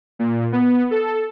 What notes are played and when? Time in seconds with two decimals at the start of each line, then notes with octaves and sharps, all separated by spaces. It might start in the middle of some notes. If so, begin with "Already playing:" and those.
0.19 A#2
0.52 B3
0.91 A4